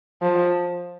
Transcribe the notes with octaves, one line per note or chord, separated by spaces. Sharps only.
F3